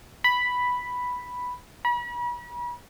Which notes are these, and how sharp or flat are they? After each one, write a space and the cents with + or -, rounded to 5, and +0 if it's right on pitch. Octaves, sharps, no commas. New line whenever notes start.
B5 +0
B5 -40